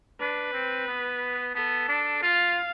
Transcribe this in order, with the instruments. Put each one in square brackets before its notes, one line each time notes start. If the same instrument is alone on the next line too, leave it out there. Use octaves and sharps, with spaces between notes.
[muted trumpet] D4 [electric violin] B4
[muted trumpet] C4
B3
[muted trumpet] B3 [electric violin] A4
[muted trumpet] D4
[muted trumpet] F4 [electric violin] F5